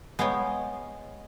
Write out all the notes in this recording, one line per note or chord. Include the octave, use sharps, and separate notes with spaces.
G#3 B3 C#5 F5 G5